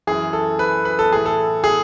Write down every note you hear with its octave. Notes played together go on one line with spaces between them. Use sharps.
F#2 E3 G#4
A4
B4
B4
A4
A2 E3 G#4
A4
G#4